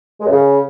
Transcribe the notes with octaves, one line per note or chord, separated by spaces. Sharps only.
G#3
F#2
C#3